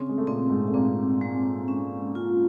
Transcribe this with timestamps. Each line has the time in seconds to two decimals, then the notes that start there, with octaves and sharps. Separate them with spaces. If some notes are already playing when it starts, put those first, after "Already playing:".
Already playing: C#3 C4 C#4
0.09 G#3
0.18 A3
0.27 A#2 A#3 C4
0.50 G#2 G#3
0.68 A3
0.74 A#2 A#3 C4
1.21 G#3
1.68 C#4
2.15 F4